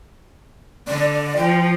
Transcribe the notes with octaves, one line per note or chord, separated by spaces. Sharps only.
D3 D5
F3 G5